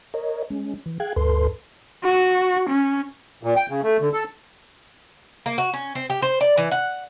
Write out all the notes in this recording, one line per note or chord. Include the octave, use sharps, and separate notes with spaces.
A#4 C#5 D#5
G#3 C#4
E3
G#4 F5 G5 F#6 G#6
D2 G2 A4 B4 C6
F#4
C#4
A#2
G5
C#3
A3
D3
A4
A#3
F#4
C#4
C4
G4
C5
D5
E3
F#5